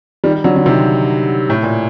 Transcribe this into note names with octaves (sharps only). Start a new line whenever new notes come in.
D#3 G3
D3 F#3
D3
C3 D#3
A2
A#2